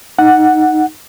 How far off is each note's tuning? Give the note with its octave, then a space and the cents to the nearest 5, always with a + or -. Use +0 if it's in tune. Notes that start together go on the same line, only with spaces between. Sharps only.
D#4 +0 F#5 +0